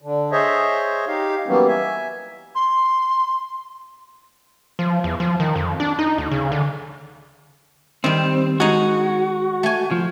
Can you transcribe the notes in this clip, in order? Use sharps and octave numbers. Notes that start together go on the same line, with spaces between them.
D3
G#4 C5 C#5 D#5 E5
D#4 G4 F5
E3 F#3 G3 A#3 B3 C#4
E5 G#5
C6
F3
E2
F3
D#3
F2
D4
D#4
D2
C#3
D3
D#3 G3 C4
G#3 D#4 F#4
A3 G#5
F3